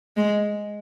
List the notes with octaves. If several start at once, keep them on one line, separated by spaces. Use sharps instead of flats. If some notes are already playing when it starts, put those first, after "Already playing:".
G#3